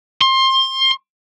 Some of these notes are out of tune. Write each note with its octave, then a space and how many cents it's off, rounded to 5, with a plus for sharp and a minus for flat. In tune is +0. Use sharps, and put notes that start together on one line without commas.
C6 +25